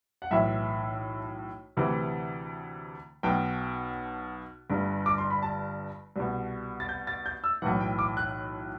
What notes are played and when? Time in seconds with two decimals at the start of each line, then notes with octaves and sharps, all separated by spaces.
0.22 F#5
0.31 B1 A2 E3 E5
1.77 D2 C3 E3
3.23 B1 B2 G5
4.70 G1 G2 D3
5.06 D6
5.18 C6
5.31 B5
5.42 A5
6.16 C2 B2
6.80 A6
6.89 G6
7.07 A6
7.26 G6
7.44 E6
7.62 B1 A2 E3 F#5
7.80 G5
7.99 D6
8.17 F#6